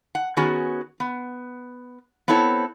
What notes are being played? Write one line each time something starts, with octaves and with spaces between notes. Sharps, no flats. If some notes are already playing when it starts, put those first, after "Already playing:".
F#5
D#3 B3 C#4 F#4 G#4
B3
B3 C4 E4 A4 C#5